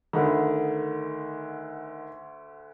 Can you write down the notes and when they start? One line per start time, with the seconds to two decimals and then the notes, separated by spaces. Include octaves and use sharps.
0.13 D2 D3 D#3 B5